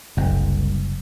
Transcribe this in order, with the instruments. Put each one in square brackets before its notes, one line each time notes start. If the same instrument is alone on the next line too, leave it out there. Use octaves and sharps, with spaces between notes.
[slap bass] F#1 [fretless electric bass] C2